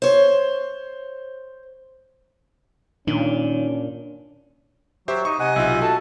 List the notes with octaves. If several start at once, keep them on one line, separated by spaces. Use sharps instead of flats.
C5 C#5
A#2 D#3 C#4 D4
F#3 G4 C5 E5
D#4 C#6
C3 D#5 F#5 G#5
B1 F4 E5
F#4 A4 A5